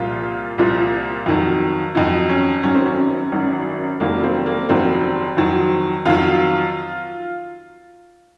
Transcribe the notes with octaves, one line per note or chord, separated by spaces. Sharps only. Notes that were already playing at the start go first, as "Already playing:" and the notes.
Already playing: C2 A#2 F3 F4
C2 A#2 F3
F2 D#3 F#3
F2 D#3 F#3 D#4
C#4
G#1 F#2 D#3 F#3 C#4
C4
C#4
G#1 F#2 D#3 F#3
F1 F2 D#3 F#3 A#3
C4
A#3
F1 F2 D#3 F#3 C4
F2 D#3 F#3
F2 D#3 F#3 F4